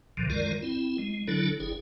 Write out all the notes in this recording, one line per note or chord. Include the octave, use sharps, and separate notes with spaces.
C2 A#2 D3 D#3 F3
F#2 D#3 G#3 F4 A#4 D5
C4 E4
G#3
D3 F#3 D4 E4 A4
G1 E4 G#4